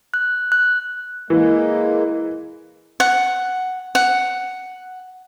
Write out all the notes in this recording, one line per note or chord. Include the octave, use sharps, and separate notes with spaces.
F#6
F#6
E3 G#3 A#3
F#5
F#5